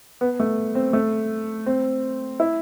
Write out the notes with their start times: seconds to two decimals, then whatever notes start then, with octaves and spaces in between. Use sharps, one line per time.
0.21 B3
0.40 A3
0.75 C4
0.93 A3
1.66 C4
2.40 E4